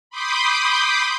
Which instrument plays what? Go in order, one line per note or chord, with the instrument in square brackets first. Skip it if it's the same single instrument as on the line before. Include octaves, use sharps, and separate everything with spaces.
[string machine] B5 C6 D6 D#6 G6